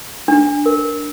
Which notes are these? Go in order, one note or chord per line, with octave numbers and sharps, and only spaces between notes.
D4
A#4